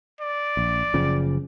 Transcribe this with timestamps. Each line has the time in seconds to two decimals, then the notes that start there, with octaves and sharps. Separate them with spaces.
0.21 D5
0.57 A#1
0.94 F#1 C#3 F3